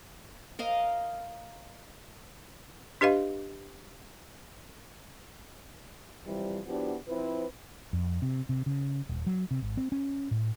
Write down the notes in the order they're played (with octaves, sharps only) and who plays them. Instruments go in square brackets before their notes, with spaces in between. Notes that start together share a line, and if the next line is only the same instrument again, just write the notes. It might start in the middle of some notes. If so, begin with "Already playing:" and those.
[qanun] A#4 D#5 F5
[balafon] D4 G4 B4 D#5 F5
[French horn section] C3 E3 F3 G3
F3 B3 D4 E4 F#4 G4
F3 C4 E4 B4
[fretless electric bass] F2
C3
C3
C#3
D#1
F#3
C3
G#1
C4
C#4
A2